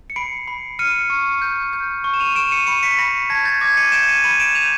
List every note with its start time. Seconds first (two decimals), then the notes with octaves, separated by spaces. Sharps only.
0.10 C#7
0.16 B5 C7 D7
0.48 B5
0.79 F6 C#7 D#7
1.10 C#6
1.42 G6
1.73 G6
2.04 C#6
2.14 E7
2.20 D#7 F7
2.35 C#6 D7 E7
2.51 C#7 D#7
2.67 B5 C#7 D#7
2.83 B6 C#7
2.98 B5 A#6 C7
3.30 A5 G#6 A#6
3.45 G6 A6
3.61 D6 G#6 A#6
3.77 C#7 D#7
3.92 G6 D7 E7
4.08 C#7 D#7
4.24 B5 C#7 D#7
4.40 D7 E7
4.55 G6 D#7 F7